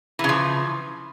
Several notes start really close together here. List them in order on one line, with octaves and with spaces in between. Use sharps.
E3 C#3 F3